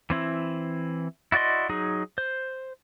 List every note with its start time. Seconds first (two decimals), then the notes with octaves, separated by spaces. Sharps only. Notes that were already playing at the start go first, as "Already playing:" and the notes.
0.10 E3 C4 E4
1.32 E4 F#4 D5 D#5 C6
1.69 F#3 D#4 G#4
2.18 C5